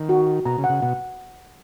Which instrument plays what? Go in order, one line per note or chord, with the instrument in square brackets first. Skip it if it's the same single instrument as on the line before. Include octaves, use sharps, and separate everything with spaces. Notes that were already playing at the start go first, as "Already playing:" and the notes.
Already playing: [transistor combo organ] D#3
[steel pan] F#4
F#4
[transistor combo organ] B2 [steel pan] A#5
[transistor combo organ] C#3
[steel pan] F#5
[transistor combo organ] C#3
[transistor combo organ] B2 [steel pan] F#5